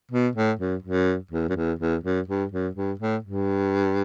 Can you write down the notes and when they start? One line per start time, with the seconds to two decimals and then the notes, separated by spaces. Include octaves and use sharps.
0.11 B2
0.35 A2
0.59 F#2
0.82 F#2
1.31 E2
1.49 F#2
1.56 E2
1.79 E2
2.03 F#2
2.28 G2
2.52 F#2
2.75 G2
2.99 A2
3.24 G2